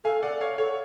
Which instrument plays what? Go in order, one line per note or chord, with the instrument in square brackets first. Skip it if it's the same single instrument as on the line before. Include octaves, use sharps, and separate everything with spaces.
[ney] A4 [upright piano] F5 G#5
[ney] A4 [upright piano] D5 F#5
[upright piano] C#5 F5
[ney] A4 [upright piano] C#5